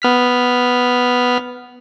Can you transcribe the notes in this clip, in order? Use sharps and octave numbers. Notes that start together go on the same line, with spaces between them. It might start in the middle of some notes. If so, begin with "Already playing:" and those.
B3 F6 B6